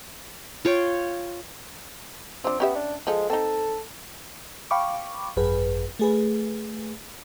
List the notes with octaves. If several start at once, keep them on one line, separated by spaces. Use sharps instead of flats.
F4 C#5 G5
F3 C4 D4
B3 C#4 G4 E5
D4
F3 G#3 A4
C4 D#4 A4
F5 G5 B5 C#6 D6
G#1 F#2 G#4 B4
A3 G#4 B4